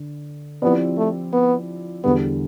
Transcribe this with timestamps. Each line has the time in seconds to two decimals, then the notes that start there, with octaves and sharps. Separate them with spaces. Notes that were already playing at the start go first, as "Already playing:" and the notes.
Already playing: D3
0.62 F3 B3 C4 E4 G4 D5
0.98 A3
1.33 B3
2.04 E2 D3 G3 B3